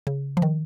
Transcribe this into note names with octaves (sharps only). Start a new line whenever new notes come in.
C#3
F3
D#3